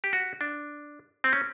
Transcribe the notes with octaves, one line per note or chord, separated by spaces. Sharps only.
G4
F#4
D4
C4
C#4